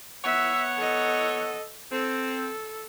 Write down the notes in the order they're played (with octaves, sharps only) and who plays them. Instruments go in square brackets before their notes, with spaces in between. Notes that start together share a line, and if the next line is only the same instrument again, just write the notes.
[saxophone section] B3 C#5 F#5 [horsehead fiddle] E5
[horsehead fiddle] A4 D#5
[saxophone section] C4 [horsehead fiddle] A4